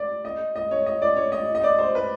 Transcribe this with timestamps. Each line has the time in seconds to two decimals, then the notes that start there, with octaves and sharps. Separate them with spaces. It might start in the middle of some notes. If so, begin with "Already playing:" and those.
Already playing: D5
0.25 D#5
0.56 D#5
0.71 C#5
0.86 D#5
1.02 D5
1.16 C#5
1.32 D#5
1.55 D#5
1.64 D5
1.79 C5
1.95 B4